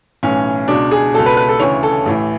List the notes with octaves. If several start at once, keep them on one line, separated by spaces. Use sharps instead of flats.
B1 A2 E3 C#4
C#2 B2 D4
G#4
C#2 B2 A4
B4
B4
A4
D2 C#3 E3 C#5
A4
A1 A2 E3